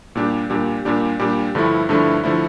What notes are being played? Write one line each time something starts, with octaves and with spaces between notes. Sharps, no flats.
A#2 G3 D4 G4
A#2 G3 D4 G4
A#2 G3 D4 G4
A#2 G3 D4 G4
G2 D3 F3 A3 E4
G2 D3 F3 A3 E4
D3 F3 A3 E4